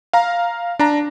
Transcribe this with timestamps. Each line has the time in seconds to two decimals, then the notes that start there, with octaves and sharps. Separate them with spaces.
0.13 F5 A#5
0.79 D4 A#5